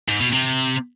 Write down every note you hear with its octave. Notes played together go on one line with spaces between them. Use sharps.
G#2
B2
C3